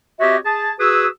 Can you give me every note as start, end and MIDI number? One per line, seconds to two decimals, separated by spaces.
0.20 0.38 60
0.20 0.38 66
0.20 0.38 67
0.20 0.38 73
0.20 0.38 75
0.20 0.38 76
0.46 0.72 68
0.46 0.72 81
0.80 1.07 66
0.80 1.07 68
0.80 1.07 71
0.80 1.07 87
0.80 1.07 88